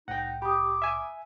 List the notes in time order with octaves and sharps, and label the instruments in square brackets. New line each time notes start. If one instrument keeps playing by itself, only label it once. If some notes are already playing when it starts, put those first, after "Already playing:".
[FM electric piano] C2 A2 [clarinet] D#4 [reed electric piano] F#5 G5
[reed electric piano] G4 [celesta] B5 D#6 [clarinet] D6
[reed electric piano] E5 G#5